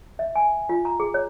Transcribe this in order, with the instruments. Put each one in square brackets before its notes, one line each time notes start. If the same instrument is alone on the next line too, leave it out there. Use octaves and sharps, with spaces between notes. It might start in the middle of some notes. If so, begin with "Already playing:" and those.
[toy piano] E5
G#5
F4
A#5
G#4
C#5